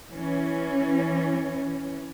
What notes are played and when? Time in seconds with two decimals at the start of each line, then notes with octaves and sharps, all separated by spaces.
0.14 E3 C#4